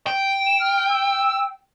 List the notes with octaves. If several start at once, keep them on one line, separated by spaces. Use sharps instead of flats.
G5
E7
F6
E6